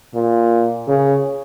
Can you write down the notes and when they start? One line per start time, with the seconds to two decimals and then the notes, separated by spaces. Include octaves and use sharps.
0.15 A#2
0.89 C#3